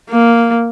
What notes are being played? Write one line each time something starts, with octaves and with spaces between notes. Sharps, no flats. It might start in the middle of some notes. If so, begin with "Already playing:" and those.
A#3